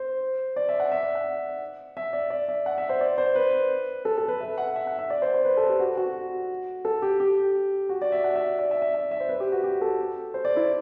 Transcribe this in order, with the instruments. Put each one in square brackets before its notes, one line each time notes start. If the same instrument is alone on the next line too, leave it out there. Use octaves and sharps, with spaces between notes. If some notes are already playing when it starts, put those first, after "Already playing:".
Already playing: [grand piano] C5
D5
E5
F#5
E5
D5
F#5
E5
D5
D5
E5
F#5
E5
C5
D5
C5
B4
A4
A4
B4
E5
F#5
E5
F#5
E5
D5
C5
C5
B4
A4
G4
F#4
F#4
A4
G4
G4
F#4
D5
E5
F#5
E5
D5
E5
E5
E5
E5
C5
B4
G4
F#4
G4
A4
C5
D5
E4